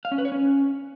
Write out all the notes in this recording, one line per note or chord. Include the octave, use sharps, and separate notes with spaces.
F5
C#4
B4
C#5
C#4